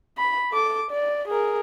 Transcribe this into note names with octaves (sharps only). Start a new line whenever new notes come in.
B5
A4 D6
D5
G#4 A#4